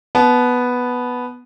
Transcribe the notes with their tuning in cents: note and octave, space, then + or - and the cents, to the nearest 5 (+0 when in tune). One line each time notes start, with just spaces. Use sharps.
B3 +0 A5 -25